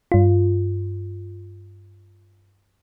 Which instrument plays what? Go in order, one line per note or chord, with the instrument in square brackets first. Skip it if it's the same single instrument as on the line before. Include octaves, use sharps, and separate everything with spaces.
[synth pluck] G2 F4